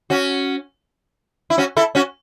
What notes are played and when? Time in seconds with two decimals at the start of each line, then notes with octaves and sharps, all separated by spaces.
0.10 C#4 F#4
1.50 E4
1.58 C#4 F#4
1.76 E4 A4
1.95 C#4 F#4